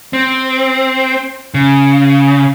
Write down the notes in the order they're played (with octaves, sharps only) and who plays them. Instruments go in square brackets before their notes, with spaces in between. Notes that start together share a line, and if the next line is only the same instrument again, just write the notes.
[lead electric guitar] C4
C#3